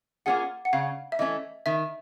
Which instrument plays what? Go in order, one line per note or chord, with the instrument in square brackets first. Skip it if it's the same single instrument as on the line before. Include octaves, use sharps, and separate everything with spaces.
[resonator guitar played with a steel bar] A#3 C#4 F4 G#4 [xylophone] F#5
[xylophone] F#5
[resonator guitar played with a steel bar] C#3 [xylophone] F5
[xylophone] E5
[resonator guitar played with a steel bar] E3 A3 C#4 [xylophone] D#5
[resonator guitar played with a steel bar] D#3 [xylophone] E5